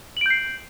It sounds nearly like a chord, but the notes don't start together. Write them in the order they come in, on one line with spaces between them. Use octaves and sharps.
F#7 D7 G6 C7